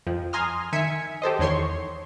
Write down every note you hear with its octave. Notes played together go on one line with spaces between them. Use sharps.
F2 F3
G#5 A#5 C6 D#6 F6
D#3 E5 G#5 G#6 B6 C#7
G4 A4 C5 D#5
E2 D#3 C#5 C6 C#6